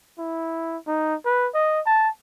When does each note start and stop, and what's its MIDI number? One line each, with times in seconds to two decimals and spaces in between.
0.18 0.77 64
0.87 1.15 63
1.25 1.49 71
1.54 1.81 75
1.86 2.09 81